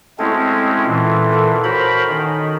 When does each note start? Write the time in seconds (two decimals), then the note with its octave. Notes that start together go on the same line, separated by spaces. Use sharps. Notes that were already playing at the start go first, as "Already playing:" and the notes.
0.19 G#3 A3 C4 C#4 E4 F#4
0.85 A#2 E3
1.31 A4 A#4 F#5
1.64 F#4 A#4 C5 C#5 B5
2.08 D#3 C#4 D#4